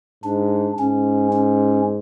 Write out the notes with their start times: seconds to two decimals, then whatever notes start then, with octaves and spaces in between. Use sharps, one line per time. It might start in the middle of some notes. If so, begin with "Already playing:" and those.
0.24 G#2 D4
0.79 G#2 C#4
1.33 C#4